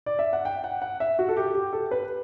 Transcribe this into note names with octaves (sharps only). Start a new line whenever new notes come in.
D5
E5
F#5
G5
F#5
F#5
E5
F#4
A4
G4
G4
A4
B4